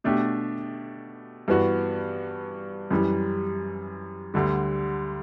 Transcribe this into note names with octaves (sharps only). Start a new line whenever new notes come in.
B2 A3 D4 G4
G2 E3 B3 F#4
F#2 E3 G3
D2 D3 G3